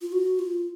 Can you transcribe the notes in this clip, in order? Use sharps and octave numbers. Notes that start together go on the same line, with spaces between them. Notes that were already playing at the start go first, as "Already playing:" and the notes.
F4
F#4
F4